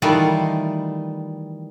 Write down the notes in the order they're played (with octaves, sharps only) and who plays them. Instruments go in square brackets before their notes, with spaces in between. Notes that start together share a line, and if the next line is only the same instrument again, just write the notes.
[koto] D#3 E3 G3 A3 F4 F#5